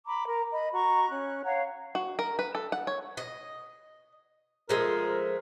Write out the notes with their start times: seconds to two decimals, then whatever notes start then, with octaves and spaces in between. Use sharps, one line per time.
0.07 A#5 B5 D6
0.28 A#4 A#5
0.52 D#5 B5
0.73 F#4 A#5 C#6
1.10 C#4 F#6
1.44 C#5 F5 F#5 A#5
1.95 F#4
2.19 A#4
2.39 B4
2.55 A4
2.72 F#5
2.87 C#5
3.17 D#5
4.69 F3 G#3 A3 A#4